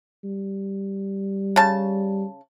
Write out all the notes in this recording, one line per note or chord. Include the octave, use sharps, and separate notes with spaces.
G3
C#3 A5